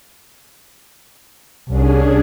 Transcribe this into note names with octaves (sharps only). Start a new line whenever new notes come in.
C2 C#4 D4 G#4